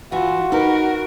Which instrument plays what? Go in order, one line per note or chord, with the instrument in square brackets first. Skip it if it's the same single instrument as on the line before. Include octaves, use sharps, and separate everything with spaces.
[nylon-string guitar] E3 [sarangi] F4 [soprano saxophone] F#4
[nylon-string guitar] D#4 B4 [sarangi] A#4